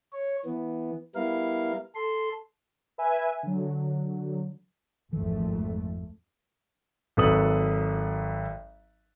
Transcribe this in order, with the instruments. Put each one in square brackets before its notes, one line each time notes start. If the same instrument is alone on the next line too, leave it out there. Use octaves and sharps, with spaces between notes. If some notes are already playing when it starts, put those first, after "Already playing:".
[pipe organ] C#5
E3 B3
G3 B3 E4 A#4 F5
A4 C6
[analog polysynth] B4 E5 G#5
D3 F#3
[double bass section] G#1 F2 A3 [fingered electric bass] E3
[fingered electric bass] G#2
[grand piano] G#1 F#3 A4 B4 D#6 F#7